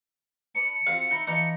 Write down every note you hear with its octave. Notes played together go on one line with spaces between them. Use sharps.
D4 B4 A5 C#7
C4 F4 F#4 F5
D#4 E4 A#4
E3 D4 D#4 F4